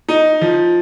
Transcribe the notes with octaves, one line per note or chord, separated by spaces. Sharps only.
D#4
F3